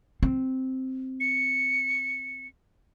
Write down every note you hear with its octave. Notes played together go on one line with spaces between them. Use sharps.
C4
C#7